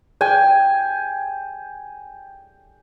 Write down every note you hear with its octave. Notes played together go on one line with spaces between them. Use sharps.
G5 G#5